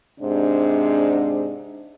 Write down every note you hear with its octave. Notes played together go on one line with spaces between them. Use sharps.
G#2 C3 D4